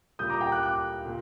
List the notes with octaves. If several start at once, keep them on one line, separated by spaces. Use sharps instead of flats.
A#2 G3 D#6 G6
A#5 D6
G5 A#5
D6 F#6
D6 F#6
A#2